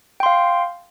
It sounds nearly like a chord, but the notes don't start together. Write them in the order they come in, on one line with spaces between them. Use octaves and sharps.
G5 C6 F5